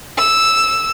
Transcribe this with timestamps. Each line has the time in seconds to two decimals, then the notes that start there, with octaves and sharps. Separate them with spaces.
0.18 E6